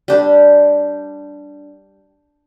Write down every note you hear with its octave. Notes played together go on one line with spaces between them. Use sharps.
G3 D4 G4